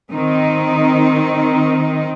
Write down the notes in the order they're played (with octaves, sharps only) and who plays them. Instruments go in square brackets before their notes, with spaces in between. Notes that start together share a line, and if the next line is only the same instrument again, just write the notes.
[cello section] D#3 C4 D#4